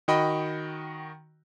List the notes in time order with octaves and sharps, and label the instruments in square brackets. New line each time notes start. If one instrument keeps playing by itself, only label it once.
[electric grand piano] D#3 F#4 D#5 G5 B5